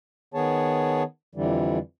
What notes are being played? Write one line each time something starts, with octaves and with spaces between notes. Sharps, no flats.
D#3 B3 G#4 C#5 A5
F2 D3 E3 G3